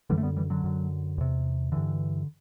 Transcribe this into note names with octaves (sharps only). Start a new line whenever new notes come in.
F#2 D3 E3 G3
A3
G3 B3
E3 G3
D3 F#3
F#2 D3
E2 C3
G2 D3 E3